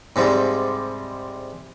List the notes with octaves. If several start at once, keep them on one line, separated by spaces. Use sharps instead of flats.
G#2 C3 G3